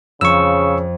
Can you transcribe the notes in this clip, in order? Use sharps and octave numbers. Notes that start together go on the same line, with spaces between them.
F2 C#3 C#6 E6